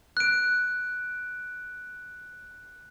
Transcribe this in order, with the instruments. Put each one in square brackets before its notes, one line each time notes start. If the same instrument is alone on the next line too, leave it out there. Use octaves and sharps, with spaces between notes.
[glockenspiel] F#6 D7